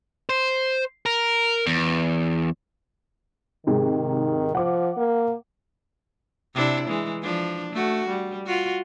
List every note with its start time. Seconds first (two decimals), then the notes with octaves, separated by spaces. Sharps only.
0.29 C5
1.06 A#4
1.66 E2
3.67 G#2 C3 D#3 G#3
4.55 F3 F#5 D6
4.97 A#3
6.54 C3 D4 E4
6.88 E3 G#3
7.22 F3 D4
7.73 A3 F#4
8.09 G3
8.46 F4 F#4